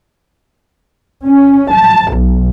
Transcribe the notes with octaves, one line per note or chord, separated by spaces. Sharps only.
C#4
A5
B1